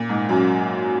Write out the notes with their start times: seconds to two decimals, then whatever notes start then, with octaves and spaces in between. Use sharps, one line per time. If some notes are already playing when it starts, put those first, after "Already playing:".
Already playing: A#2
0.09 G#2
0.29 F#2